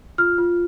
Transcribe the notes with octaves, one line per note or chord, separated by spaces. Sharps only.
F4 F6
F4